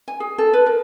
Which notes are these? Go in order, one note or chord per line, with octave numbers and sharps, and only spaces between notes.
G#5
G#4
A4
B4
A#4